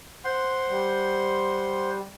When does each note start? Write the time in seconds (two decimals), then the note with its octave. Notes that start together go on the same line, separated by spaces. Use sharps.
0.24 C5 F#5 C6
0.68 G3